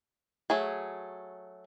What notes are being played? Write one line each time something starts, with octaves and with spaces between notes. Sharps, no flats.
F#3 A3 G#4